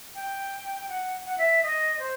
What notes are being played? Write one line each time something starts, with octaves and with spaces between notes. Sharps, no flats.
G5
F#5
F#5
E5
D#5
C5